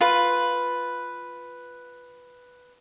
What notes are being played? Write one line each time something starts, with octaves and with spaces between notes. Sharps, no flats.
F4 B4